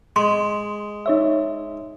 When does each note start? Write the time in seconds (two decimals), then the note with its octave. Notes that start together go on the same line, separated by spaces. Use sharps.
0.16 G#3 C6
1.06 D#4 C#5 E5